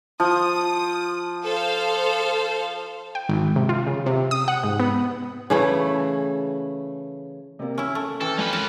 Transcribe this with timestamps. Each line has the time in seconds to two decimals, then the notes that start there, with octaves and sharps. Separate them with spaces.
0.20 F3 D#6
1.43 A4 C5 F5
3.15 G5
3.29 G#1
3.56 C3
3.69 F4
3.86 C#3
4.06 C3
4.31 D#6
4.48 F#5
4.64 G#2
4.80 B3
5.50 C#3 E3 A3
7.59 C3 A#3
7.78 C#4 E4 E5
7.95 A3
8.21 E3 A4 G5 G#5 F6
8.38 F2 C#4 B4 G5
8.53 A#4 A5